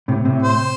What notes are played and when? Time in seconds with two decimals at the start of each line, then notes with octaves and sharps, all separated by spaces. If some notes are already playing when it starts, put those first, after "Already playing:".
0.08 A2 C3
0.25 A2 C3
0.42 C5